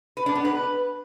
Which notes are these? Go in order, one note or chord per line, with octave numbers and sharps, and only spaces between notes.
B4
D4
B3
B4